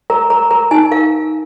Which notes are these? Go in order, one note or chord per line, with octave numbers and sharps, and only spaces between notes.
A#4 A#5
A#4 A#5
A#4 A#5
D#4 G#5
A#4 F5